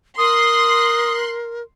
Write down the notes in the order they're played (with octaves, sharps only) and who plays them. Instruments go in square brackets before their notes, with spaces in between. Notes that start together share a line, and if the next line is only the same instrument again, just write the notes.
[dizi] A#4 [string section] C6 F#6 [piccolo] D#6